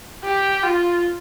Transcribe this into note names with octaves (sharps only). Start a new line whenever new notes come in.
G4
F4